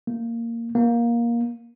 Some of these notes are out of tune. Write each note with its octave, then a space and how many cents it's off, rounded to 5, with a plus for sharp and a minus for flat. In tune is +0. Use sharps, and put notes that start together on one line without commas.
A#3 -10
A#3 +15